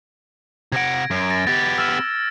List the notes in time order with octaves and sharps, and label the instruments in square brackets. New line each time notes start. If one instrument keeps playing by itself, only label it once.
[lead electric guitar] C3 F#5 [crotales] G#6 A#6 D7
[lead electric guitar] F#2
[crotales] A6 A#6 D7
[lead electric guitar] B3 G4 [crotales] A6
[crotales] E6 F6 E7